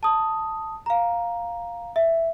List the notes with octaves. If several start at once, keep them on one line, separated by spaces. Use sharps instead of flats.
A5 D#6
F5 A#5
E5